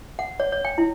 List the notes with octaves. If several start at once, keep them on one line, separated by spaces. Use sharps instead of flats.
F#5
C#5
C#5
G5
E4